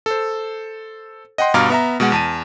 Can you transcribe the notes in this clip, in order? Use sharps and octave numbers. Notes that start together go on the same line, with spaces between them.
A4 C5
D#5 F#5 G5 C6
G2 B2 F5 A#5 D6 F6
B3 E5 A#5
B2 G#3 F#5
E2 A5 D#7